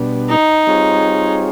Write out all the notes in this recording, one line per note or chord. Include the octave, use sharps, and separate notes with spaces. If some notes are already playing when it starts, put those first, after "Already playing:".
Already playing: B2 G3 B3 D4
D#4
G3 C4 F4 G#4 C#5